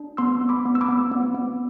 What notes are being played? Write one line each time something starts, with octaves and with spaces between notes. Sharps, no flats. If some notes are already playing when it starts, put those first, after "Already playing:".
Already playing: D4
B3 C6 E6
B3
B5 D6
B3
E6
B5 D6
B3
B3
B3